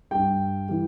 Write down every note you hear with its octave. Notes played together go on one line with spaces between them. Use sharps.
G2 G3 G5
E3 G3